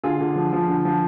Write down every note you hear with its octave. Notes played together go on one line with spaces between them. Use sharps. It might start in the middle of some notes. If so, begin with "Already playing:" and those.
D3 F4 G#4
D3
F3
F3
D3
F3